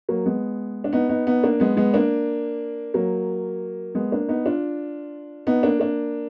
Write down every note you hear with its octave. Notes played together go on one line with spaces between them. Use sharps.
F#3 A#3
G#3 B3
D4
B3 D#4
B3 D#4
B3 D#4
A#3 D4
G#3 B3
G#3 B3
A#3 D4
F#3 A#3
G#3 B3
A#3 D4
B3 D#4
D4 F4
B3 D#4
A#3 D4
A#3 D4